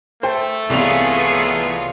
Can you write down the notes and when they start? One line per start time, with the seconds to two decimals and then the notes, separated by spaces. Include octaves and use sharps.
0.23 A3 C5 G5
0.70 C2 E3 B3 F4 G#4 C#5 F7